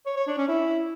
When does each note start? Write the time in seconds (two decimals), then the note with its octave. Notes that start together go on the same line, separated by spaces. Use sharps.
0.06 C#5
0.17 C#5
0.27 D4
0.38 C#4
0.48 E4